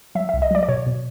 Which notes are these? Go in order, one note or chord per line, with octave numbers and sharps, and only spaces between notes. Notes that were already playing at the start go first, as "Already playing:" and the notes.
F#3 E5
E5
C2
D#5
F#3 D5
D5
B2 C#5
B2